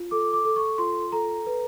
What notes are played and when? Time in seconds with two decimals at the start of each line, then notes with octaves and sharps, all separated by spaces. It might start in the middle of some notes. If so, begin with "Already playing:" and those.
Already playing: F4
0.11 A4 D6
0.33 D6
0.45 A4
0.56 C#6
0.78 F4 C6
1.12 A4 A#5
1.46 B4